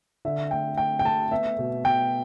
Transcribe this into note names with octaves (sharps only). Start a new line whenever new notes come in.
D3 E5
A3 G5
A3 G5
G5
A3 A5
B3 E5
B2
B2 G5